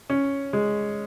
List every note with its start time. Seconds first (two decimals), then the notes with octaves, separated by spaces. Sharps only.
0.10 C#4
0.53 G#3